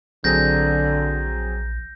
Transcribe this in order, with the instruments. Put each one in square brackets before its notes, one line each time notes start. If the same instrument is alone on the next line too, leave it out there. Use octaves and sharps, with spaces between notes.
[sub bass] A#1 [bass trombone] D3 [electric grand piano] F#3 C4 G#4 [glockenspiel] G6 A#6